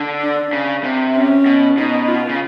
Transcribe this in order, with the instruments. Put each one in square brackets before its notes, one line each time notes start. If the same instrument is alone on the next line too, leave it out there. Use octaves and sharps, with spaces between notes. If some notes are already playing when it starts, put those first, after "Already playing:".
Already playing: [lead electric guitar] D3
[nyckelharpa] D4
[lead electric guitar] C#3
C3
[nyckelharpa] C#4
[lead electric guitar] B2
[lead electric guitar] B2 [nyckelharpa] D#4
[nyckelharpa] F4
[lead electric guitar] C#3